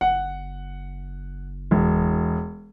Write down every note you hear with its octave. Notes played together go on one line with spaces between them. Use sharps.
F#1 F#5
E1